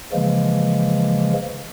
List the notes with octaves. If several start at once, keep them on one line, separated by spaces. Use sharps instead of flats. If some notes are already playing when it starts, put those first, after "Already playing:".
C#3 E3 F3 G#3 A#3